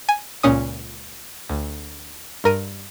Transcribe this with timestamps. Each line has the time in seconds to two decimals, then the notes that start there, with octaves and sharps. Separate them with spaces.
0.09 G#5
0.43 C#2 A#2 C#4 D#6
1.49 D2
2.44 G2 A#4 D#7